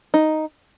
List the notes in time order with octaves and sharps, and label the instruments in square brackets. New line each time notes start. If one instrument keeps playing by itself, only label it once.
[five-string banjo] D#4